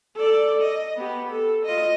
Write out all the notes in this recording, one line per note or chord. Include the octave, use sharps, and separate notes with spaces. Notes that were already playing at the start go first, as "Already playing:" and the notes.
A4 D5
D#5
B3 G4
A4
F4 D#5